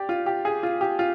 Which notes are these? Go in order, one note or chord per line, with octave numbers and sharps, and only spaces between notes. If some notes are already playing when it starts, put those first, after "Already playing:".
Already playing: G4 D5
F4
G4
G#4
F4
G4
F4